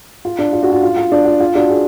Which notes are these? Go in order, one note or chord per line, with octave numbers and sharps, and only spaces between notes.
F4
D4
F4
D4 F#4
F4
F4
F4
D4
F4
F4
D4 F#4
F4 G#4